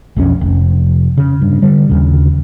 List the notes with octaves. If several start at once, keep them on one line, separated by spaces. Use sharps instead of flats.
B1 F2 F3 C#4
F1
C#3
G2
D3 G3
D#2 C#3